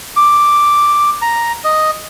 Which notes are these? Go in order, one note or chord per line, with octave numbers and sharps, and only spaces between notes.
D6
A#5
D#5